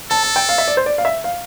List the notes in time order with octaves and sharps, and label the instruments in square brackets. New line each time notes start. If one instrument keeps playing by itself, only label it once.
[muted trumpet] A4 [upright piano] A5
[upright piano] A5
G5
F5
E5
D5
C5
D5
F5
E5
F5